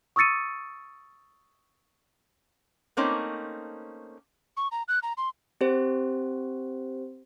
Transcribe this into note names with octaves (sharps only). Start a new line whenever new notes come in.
C#6 D#6 E6 A6 C#7 D#7
A3 A#3 C4 C#4 D#4
C#6
A#5
F#6
A#5
C6
C4 G4 C5